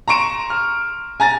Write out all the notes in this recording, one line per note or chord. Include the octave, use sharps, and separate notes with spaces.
A#5 C6 C#6 D7 E7
F6
G#5 A#5 A6